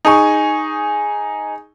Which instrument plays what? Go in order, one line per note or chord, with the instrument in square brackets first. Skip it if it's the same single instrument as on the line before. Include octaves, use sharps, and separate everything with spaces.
[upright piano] D#4 G#4 G#5 C#6